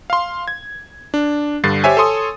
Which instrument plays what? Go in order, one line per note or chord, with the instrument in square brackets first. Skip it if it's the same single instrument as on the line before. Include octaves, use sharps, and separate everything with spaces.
[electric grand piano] F5 C6
G#6
D4
G2 D3 A6 C7
G4 C5 C#5 E5 G#5
A4 C#5 G#5 C6 D#6